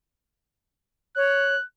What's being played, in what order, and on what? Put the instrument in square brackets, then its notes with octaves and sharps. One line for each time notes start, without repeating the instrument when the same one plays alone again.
[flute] C#5 [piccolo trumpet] F#6